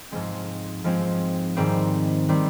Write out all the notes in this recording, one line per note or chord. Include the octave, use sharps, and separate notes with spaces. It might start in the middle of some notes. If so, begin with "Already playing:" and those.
G#2 F3 G#3 C4
G#2 F3 G#3 C4
G#2 D#3 G3 C4
D#3 G3 C4